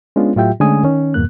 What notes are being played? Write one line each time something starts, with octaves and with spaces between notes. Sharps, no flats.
G#3 B3 C#4 D4 F4
A2 F#3 F4 G4 E5 G5
D3 G#3 A3 C#4 G#5 D#6
D#3 C#4
E2 G2 B2 A#3 F#6